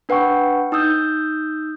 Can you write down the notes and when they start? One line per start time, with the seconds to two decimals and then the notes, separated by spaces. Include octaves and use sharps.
0.09 D4 B4 F#5 G5 C#6
0.72 D#4 D#6 E6 G6